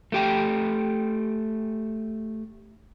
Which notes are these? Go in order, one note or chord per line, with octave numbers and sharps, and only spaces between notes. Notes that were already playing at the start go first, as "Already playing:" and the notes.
A3 G4 G5